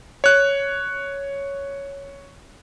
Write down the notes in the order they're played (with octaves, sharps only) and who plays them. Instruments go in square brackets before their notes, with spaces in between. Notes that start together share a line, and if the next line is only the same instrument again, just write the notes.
[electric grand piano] C#5 F#6